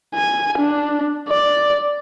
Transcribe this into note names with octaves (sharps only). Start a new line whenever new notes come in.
G#5
D4
D5